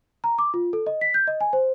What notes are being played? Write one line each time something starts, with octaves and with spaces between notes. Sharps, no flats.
A#5
D6
F4
A4
D#5
B6
G6
D#5
G#5
C5